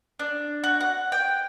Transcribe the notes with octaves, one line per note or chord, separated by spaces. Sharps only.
D4
F#4
F#5
G5